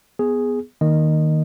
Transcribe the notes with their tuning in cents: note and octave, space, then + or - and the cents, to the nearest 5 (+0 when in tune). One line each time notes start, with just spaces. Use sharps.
B3 +0 G#4 +0
D#3 +0 A#3 +0 D#5 -15